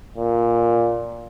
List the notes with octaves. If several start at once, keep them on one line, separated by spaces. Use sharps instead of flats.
A#2